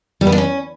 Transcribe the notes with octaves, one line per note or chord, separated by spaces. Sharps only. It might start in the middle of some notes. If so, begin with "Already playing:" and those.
G3
B3
D4
C#4